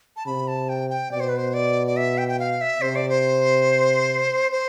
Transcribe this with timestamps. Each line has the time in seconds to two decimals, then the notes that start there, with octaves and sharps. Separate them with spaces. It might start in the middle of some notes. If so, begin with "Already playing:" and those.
0.16 A5
0.26 C3 B5
0.48 A5
0.69 G5
0.90 G5
1.11 B2 D5
1.20 C5
1.29 B4
1.37 C5
1.54 D5
1.87 D5
1.97 E5
2.18 G5
2.29 G5
2.39 F5
2.61 E5
2.82 C3 C5
2.96 D5
3.09 C5
4.52 C5